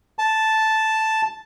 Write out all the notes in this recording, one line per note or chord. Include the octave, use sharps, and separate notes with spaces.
A5